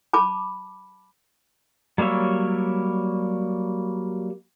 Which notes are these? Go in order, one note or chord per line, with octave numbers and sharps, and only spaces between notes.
A5 B5 D6
F#3 G3 A#3 C#5 E5